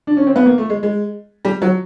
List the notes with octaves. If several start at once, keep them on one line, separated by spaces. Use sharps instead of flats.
D4
C#4
C4
B3
A#3
A3
G#3
G#3
G3
F#3